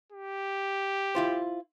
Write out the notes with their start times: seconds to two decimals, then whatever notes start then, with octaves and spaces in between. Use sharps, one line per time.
0.12 G4
1.15 E4 F4 C5